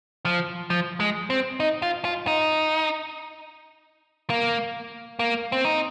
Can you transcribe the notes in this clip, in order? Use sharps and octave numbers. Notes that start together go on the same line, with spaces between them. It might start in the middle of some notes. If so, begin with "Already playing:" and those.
F3
F3
G#3
C4
D#4
F4
F4
D#4
A#3
A#3
C4
D#4